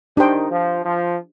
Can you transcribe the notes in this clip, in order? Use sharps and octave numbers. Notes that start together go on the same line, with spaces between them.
D#3 D4 G4 C5 G5
F3
F3